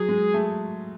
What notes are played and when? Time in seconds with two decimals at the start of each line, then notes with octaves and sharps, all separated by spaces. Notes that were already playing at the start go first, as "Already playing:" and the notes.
Already playing: F#3 G#4
0.09 G#3
0.34 A3